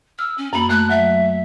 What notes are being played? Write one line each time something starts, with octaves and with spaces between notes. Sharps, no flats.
E6 F6
C#4
F#2 A#3 B5
A3 F#6
F#3 E5